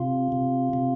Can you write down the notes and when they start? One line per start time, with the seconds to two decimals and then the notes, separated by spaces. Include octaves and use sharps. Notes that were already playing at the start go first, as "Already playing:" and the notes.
Already playing: C3 F4
0.32 C3
0.73 C3